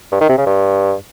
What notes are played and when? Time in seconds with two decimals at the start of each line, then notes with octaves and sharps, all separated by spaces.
0.12 G2
0.21 D#3
0.29 C3
0.38 C#3
0.46 G2